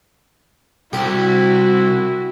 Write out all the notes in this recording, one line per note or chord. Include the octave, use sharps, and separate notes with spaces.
C2 E4 F#4 G4